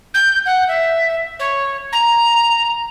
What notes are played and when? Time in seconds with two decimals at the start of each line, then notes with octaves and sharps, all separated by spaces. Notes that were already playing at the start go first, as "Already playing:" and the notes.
0.14 G6
0.45 F#5
0.68 E5
1.39 C#5
1.92 A#5